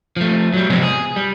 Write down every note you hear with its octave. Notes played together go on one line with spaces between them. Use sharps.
F3 A3
F#3 G3
C3 F3 G3 G#3 B3 C4
G#4
G3